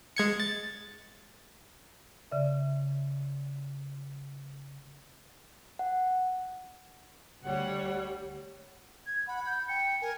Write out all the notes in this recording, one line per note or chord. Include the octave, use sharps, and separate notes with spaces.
G#3 G#6 C#7
A6
C#3 D5 E5
F#5
D2 G3 C#5 F#5
G#6
F#5 B5
G6
G5 C#7
A#4 G#5